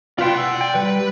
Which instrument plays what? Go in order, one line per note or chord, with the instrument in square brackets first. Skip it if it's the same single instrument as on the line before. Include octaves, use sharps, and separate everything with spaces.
[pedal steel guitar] F4 B4 G5 [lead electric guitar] D5 C6
[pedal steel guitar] F#5 E6
G5
[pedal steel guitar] G3 [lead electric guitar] B4